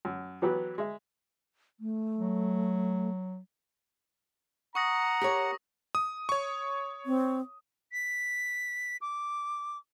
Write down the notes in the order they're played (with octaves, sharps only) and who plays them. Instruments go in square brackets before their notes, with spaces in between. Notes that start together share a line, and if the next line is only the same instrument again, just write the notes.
[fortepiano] F#2
E3 F#3 B3 G4 B4
G#3 E5
[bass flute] A3
[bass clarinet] F#3
[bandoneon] F#5 [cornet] A#5 [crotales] C#6 D#6 A#6
[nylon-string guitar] G4 A#4 C#5
[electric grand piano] D#6
C#5 C#6
[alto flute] C4
[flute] B6
D6